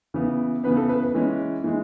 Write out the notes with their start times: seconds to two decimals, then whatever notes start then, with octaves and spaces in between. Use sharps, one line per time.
0.14 C#3 E3 B3
0.64 C#3 E3 B3 B4
0.77 A4
0.89 B4
1.02 B4
1.15 E3 G#3 C#4
1.64 E3 G#3